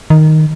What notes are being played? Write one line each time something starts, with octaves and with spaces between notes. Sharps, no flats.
D#3